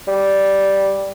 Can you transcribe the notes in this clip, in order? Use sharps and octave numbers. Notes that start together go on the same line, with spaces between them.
G3